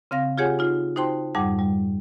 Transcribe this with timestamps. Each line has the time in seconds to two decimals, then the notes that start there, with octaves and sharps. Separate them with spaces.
0.11 C#3 C4 F5 A#6
0.38 F4 G4 G#4 C#5 F#5 G#5
0.59 D#4 F4
0.96 D#4 F#4 C5 G5 A5 C6
1.35 F2 G#2 G3 D#4 F#5 D6
1.59 G3